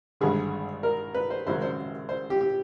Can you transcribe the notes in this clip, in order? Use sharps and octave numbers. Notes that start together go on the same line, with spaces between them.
G#1 G2 D3 G#4
A#4
B4
C5
G#1 F#2 C#3 F#3 C5
C5
C5
G4
G4